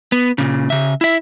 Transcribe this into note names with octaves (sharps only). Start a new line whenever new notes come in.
B3
A#2 C#3
C#3 E5
E4 E5